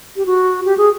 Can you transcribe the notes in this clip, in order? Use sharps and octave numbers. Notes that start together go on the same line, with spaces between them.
G4
F#4
G4
G#4